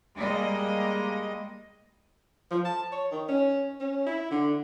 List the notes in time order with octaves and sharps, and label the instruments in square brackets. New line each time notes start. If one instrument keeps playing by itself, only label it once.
[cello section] G3 G#3 A#3 D#5
[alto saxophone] F3
A5
C#5
D#3
C#4
C#4
E4
D3